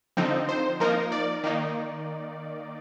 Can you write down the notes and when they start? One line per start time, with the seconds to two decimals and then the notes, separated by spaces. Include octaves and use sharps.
0.17 D3 F3 C4 D#4
0.49 C5
0.80 F3 A#3 D#4 A#4
1.12 D5
1.44 D#3 A#3 D#4